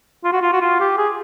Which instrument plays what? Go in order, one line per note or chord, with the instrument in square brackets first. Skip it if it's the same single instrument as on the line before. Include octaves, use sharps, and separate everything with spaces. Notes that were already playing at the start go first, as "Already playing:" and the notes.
[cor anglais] F4
F#4
F4
F#4
F4
G4
G#4